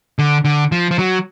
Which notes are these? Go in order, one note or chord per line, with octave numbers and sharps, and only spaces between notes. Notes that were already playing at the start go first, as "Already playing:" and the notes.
D3
D3
F3
F3
F#3